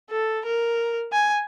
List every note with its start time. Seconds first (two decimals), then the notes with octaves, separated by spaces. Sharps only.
0.10 A4
0.45 A#4
1.13 G#5